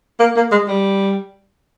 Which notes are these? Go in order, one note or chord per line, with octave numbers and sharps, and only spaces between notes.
A#3
A#3
G#3
G3